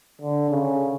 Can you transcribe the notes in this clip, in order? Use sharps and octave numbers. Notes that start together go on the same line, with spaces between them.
D3
C#3